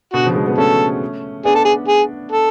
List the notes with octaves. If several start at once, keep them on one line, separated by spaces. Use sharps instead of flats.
B2 D3 F#4
C#3 F3
F3 G#3
G#3 B3
A3 C#4 A4
B3 D4 G#4
A4
G#4
G#4
A4